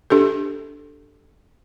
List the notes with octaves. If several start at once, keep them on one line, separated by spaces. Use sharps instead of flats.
D4 G4 A4